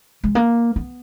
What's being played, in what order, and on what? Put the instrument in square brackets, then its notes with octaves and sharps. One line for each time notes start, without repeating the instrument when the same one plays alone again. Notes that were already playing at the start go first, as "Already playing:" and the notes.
[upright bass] G#3
A#3
B3